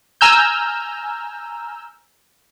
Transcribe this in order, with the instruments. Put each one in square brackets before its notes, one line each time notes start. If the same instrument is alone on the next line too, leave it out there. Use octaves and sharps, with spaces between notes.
[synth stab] G#5 A#5 E6 F6 G6